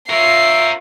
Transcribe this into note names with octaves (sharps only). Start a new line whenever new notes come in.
F4 A#4 C#5 E5 C7